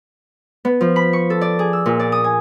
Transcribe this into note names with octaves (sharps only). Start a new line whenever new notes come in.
B3
F3
B5
C#6
A4
D5
G#4
E6
A#2
D5
D#6
G#5